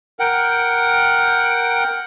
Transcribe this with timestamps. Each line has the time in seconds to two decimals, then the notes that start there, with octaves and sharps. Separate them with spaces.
0.20 A#4 F#5 G5